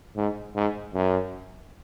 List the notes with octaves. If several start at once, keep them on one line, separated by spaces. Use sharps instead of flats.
G#2
G#2
F#2